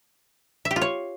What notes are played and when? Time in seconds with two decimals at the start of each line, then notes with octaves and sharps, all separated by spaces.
0.65 E5
0.71 G4
0.76 F4
0.82 C#5